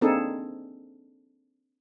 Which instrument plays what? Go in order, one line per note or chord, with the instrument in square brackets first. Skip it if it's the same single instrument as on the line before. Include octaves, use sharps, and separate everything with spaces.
[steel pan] A#3 C4 D4 D#4 G#4 A4